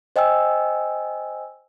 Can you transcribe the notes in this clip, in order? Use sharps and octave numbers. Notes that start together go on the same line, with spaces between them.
C5 D#5 G5 G#5 E6